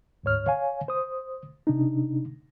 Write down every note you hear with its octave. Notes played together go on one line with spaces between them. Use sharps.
D2 G#2 C#5 F6
C#5 F5 G#5
C5 D#6
C3 D4 D#4